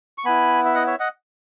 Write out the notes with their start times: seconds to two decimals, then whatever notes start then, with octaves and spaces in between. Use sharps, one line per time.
0.18 C#6
0.25 B3 E4 G#5 B5
0.65 E5
0.74 D#5 F#5
0.87 C#5 E5
1.00 D#5 F#5